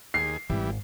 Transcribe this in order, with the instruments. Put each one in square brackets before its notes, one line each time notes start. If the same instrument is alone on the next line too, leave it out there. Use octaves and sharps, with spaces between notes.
[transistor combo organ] D#2 G#4 [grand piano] C7
[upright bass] G#1 [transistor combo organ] E3 G3